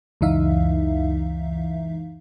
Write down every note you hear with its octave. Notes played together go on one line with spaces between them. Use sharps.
C#2 F#2 E3 D#4 E5 F5